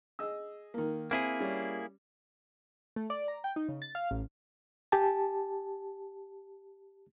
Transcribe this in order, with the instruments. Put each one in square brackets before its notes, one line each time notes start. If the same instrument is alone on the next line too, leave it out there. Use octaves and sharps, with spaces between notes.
[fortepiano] G#4 D#5 E6
D#3 A#3
[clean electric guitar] A#3 E4 G#4 [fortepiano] C4 G#5
[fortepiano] G3 C#4
[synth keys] A3
D5
A#5
G5
D#4
C#3
A6
F5
A1
[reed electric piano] G4 G#5 A5